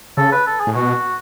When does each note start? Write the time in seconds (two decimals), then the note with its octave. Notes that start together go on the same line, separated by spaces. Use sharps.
0.17 C#3 A4
0.32 B4
0.47 A4
0.60 G#4
0.67 A2
0.75 B2 F#4